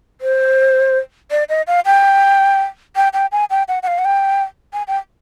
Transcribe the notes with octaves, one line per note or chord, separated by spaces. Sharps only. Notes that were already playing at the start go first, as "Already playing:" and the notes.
C5
D5
D#5
F5
G5
G5
G5
G#5
G5
F#5
F#5
F5
F#5
G5
G#5
G5